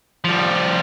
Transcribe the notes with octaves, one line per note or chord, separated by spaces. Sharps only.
F3 G3